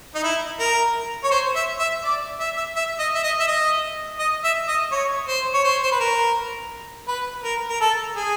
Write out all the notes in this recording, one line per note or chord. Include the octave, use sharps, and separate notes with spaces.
D#4
E4
A#4
C#5
C5
E5
E5
D5
E5
E5
E5
D#5
E5
D#5
E5
D#5
D#5
E5
D#5
C#5
C5
C#5
C5
C5
B4
A#4
B4
A#4
A#4
A4
G#4